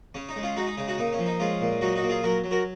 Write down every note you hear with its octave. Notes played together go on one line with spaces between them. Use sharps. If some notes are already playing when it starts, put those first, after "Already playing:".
C#3 C#4
D#4
G#3
C#4 F4
G#3 D#4 F#4
D#4
C#3 D#4
D#4 F#4
A#2 D#4
C#4
F3
D#4
G#3 C#4 F4
A#2
F#3 D#4 F#4
D#4 F#4
A#2
F4 G#4
F#3 F#4 A#4
F#3
F#4 A#4